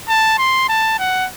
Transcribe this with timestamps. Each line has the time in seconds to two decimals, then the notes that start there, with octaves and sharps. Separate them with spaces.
0.08 A5
0.38 C6
0.69 A5
0.99 F#5